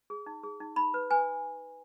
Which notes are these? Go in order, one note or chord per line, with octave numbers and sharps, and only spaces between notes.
G#4
D#4
G#4
D#4
D#4 B5
B4
B4 G#5